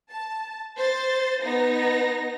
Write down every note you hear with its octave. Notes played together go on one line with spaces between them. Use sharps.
A5
C5 A6
B3 D#4 A#6